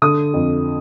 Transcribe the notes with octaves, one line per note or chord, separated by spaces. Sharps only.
D3 D#6
F2